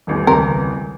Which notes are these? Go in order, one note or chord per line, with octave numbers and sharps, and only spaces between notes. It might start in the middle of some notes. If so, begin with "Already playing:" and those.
D#1 A1 E2
C#2 D#3 C4 A#4